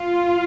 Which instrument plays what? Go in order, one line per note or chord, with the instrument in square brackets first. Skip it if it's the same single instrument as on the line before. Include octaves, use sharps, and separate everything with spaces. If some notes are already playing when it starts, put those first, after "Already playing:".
Already playing: [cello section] F4